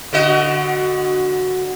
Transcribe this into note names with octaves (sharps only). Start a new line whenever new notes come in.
D3 F#4 D#5